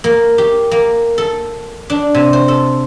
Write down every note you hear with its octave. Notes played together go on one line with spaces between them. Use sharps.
A#3
G4
A#3
A4
D4
C3
C5
A4